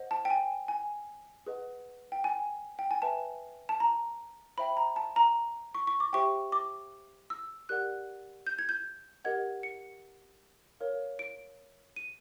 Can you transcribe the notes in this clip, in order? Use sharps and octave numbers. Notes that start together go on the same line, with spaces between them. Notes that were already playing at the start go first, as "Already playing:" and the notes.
Already playing: C5 D#5 F#5
A5
G5
G#5
G#5
G#4 B4 D#5 F#5
G5
G#5
G5
G#5
B4 E5 G5 A5
A5
A#5
C5 E5 G5 B5
A#5
A5
A#5
C#6
C#6
D6
G4 C5 E5 G5 C#6
D6
E6
G4 A#4 D5 F#5 F#6
G6
G#6
G6
G4 A#4 D#5 F#5 G#6
C#7
A#4 C#5 F5
D7
D#7